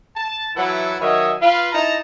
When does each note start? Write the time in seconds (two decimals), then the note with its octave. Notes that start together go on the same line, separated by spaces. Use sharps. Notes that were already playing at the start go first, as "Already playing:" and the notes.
0.16 A5
0.56 E3 F#3 E4 A4 B4 F#5
1.01 D#3 F#3 C#5 D#5 E5 G#5
1.41 F4 B4 F5
1.72 D#4 E4 A5 A#5